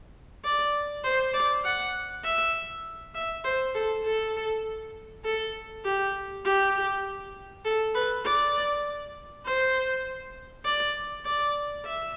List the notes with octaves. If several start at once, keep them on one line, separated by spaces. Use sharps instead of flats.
D5
C5
D5
F#5
E5
E5
C5
A4
A4
A4
G4
G4
A4
B4
D5
C5
D5
D5
E5